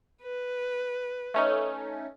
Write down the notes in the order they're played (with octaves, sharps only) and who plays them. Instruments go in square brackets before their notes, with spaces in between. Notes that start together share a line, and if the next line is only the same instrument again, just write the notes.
[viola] B4
[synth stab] A3 C#4 D#4